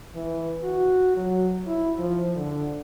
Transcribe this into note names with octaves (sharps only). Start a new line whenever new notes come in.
E3
F#4
F#3
E4
F3
D3